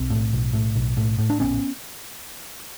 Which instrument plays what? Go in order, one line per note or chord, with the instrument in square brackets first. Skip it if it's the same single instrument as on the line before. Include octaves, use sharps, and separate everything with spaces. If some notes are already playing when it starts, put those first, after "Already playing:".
Already playing: [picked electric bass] B1 C4
A2
B1
A2
B1
A2
A2
D4
A#1 B3 C#4